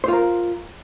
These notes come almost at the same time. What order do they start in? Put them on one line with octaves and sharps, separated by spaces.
C5 F4 A#4